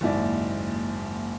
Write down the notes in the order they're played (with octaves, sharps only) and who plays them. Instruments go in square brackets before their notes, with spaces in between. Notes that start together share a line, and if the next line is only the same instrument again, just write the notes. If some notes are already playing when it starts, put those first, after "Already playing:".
[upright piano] F#1 D#2 G#2 E4 D5